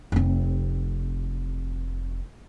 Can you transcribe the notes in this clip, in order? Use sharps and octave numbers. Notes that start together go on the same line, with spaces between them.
F1 C4